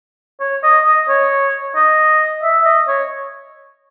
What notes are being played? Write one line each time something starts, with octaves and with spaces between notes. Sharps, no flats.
C#5
D#5
D#5
C#5
D#5
E5
D#5
C#5